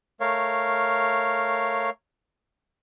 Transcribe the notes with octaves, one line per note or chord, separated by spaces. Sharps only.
A3 A#4 C#5 F5